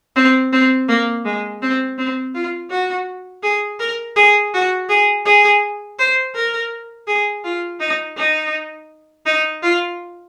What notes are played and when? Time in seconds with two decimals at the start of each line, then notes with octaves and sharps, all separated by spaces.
0.16 C4
0.53 C4
0.89 A#3
1.25 G#3
1.62 C4
1.98 C4
2.35 F4
2.71 F#4
3.43 G#4
3.80 A#4
4.16 G#4
4.54 F#4
4.89 G#4
5.26 G#4
5.99 C5
6.36 A#4
7.08 G#4
7.44 F4
7.80 D#4
8.18 D#4
9.26 D#4
9.63 F4